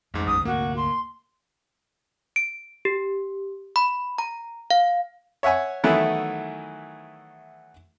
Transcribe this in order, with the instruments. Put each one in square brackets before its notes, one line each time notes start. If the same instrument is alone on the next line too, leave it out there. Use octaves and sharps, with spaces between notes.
[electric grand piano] A1 G#2 [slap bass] F2
[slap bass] B1 F#2 [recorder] D#6
[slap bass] D2 G#2 C3 [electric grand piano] A#3 [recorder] F#4
[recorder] C6
[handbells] D7
G4
B5
A#5
F5
[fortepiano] C#5 E5 F#5 G#5 C#6
D#3 E3 F#3 A3 B3 E4